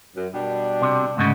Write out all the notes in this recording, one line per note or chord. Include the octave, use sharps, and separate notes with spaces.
F#2
B2 G3 D4
C3
D2 G#2 C#3